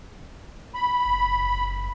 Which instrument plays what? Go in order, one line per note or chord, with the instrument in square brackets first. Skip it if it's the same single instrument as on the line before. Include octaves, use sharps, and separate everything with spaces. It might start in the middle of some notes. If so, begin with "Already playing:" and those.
[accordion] B5
[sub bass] F#1